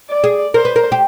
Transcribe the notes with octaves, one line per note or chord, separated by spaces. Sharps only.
D5
G#4
A#4 C5
B4
A#4
G4